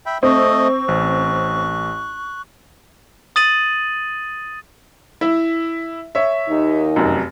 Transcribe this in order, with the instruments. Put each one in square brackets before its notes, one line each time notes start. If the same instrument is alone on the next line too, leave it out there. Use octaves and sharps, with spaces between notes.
[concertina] E5 G5 B5
[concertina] A3 D#5 [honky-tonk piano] C4 [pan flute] C#6
[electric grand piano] A1 [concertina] F#6
[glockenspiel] D#6 A6 D#7 F#7
[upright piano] E4 E5
C#5 E5
[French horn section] D#2 D#4
[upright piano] F1 F#2